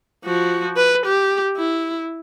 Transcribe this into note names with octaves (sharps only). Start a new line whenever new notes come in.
F3 F#4
B4
G4
E4